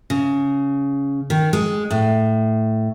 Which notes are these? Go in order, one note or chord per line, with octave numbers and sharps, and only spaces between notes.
C#3
D#3
G#3
A2